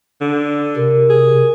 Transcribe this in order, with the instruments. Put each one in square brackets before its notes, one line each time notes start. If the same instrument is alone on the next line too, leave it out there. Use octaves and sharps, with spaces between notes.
[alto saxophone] D3
[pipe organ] C3 [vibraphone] A#4
[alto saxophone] G#4